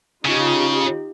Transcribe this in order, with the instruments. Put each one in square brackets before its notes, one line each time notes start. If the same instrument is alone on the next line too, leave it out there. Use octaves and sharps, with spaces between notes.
[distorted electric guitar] C#3 [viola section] D#4 F4 G4